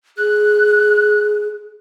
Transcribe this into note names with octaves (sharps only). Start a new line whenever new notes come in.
G#4 F#6